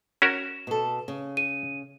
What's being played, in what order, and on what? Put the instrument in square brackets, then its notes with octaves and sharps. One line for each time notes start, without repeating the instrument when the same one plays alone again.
[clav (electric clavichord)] C#4 F#4 A#4 [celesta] E7
[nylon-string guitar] B2 A4
C#3
[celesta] D#7